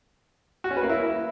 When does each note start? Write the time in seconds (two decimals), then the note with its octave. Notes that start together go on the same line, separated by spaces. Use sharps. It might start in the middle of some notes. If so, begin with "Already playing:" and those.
0.64 F#4
0.70 C#4
0.77 B4
0.83 A#3
0.89 E4